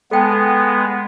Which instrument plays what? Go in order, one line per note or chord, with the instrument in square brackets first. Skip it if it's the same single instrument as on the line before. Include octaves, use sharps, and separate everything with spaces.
[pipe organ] G#3 B3 [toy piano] A4 G5 A5